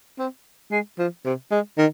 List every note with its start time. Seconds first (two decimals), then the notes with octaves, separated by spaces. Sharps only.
0.19 C4
0.71 G#3
0.98 F3
1.25 C3
1.51 G#3
1.78 D#3